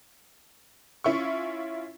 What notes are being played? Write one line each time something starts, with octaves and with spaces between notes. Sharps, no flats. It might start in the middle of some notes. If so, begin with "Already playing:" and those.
C#4 E4 F4 C#6